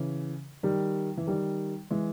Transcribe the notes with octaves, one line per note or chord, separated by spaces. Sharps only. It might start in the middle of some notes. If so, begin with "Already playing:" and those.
Already playing: C#3 E3
D#3 G3
E3
D#3 G3
E3 G#3